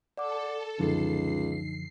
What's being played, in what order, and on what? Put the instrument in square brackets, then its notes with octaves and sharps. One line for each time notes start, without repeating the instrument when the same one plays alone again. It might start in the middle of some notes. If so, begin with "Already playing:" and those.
[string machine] A4 [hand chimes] D5 F#5 D6
[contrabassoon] C#2 [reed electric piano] F#2 D3 F3 [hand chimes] D#4 [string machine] C7